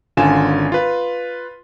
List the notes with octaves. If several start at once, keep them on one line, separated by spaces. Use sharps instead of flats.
G#1 D3 C#4 F4 G#5 E7
F4 B4